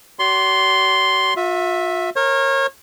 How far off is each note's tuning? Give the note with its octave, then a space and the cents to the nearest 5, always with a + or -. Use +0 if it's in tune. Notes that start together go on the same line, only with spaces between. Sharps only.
F#4 +45 D5 -40 C6 +0
F4 +45 E5 +0
A#4 +0 C#5 -30